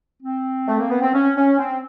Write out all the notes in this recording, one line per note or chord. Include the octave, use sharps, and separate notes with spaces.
C4
A3
A#3
B3
C4
C#4
C#4
C4